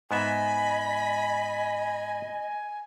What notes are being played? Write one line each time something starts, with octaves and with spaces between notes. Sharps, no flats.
G#2 B3 D#5 E5 G#5 B5